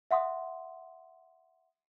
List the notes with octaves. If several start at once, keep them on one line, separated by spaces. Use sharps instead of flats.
E5 F#5 C6 D#6